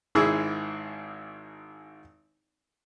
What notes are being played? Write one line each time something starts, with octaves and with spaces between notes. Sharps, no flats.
G#1 G#2 E4 G#4 E6